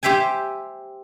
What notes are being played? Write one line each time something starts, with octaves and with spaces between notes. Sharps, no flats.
G4 C5 E5 G5 G#5